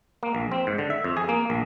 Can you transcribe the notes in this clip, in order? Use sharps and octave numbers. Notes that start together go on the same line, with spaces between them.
A#3
A#1
C4
G#2
D3
E5
F2
G#4
A#3
A#1